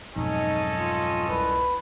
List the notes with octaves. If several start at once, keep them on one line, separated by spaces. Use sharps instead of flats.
B1 F2 G#2 C#4 D#4 A4 D#5
F4
C2 B4